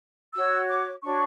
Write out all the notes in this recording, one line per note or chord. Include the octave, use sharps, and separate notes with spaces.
F#4 C#5 E6
D6
D4 F#4 C#5 C#6